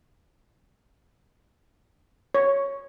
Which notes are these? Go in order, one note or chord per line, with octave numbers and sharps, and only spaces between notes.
C#5